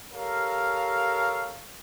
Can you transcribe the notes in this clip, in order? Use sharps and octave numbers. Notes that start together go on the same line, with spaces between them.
G4 A4 A#4 C#5 F5